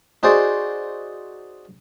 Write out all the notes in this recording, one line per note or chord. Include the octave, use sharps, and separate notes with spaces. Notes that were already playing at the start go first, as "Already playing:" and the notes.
D#4 F#4 G#4 C5 D5